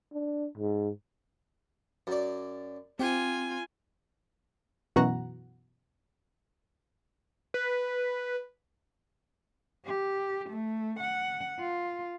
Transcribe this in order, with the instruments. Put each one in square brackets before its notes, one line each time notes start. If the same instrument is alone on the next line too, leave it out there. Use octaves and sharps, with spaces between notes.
[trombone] D4
G#2
[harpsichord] F#2 D5
[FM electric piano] C4 [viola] F4 G#5 [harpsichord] G4 F#5
[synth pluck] F#2 B2 E3 F#4 F#5 A#5
[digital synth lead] B4
[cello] G4
A3
F#5
F4